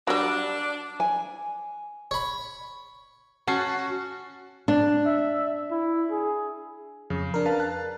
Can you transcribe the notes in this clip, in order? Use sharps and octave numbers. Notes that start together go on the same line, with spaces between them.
F#3 G3 D4
G#5
C#5 B5
C#4 F#4 F#5 A5 C7
D4
E5
E4
G#4
F2 C#3
D4 A#4
B4 F5 A5
A5 F#6